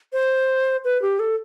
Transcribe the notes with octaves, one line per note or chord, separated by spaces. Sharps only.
C5
B4
G4
A4